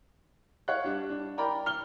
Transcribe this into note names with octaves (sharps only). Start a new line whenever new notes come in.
C#5 F5 F#5 F#6
G3 D4
D4
A#4 D5 G5 A#5 B5
F6 G7